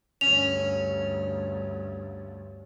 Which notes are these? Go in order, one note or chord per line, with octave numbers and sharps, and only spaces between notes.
D2 G2 C#4 F7